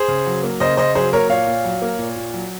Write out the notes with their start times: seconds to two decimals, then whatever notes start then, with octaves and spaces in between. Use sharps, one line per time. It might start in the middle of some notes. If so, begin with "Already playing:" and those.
Already playing: G#4 C5
0.08 C#3
0.26 F#3
0.43 A#3
0.60 C#3 C5 D#5
0.77 C#3 C5 D#5
0.95 F#3 G#4 C5
1.13 A#3 A#4 C#5
1.29 A#2 C#5 F5
1.47 A#2
1.65 F#3
1.82 A#3
1.99 A#2
2.16 A#2
2.34 F#3